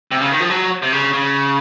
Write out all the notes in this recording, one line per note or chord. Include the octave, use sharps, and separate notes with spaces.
C3
C#3
D#3
F3
F#3
C3
C#3
C#3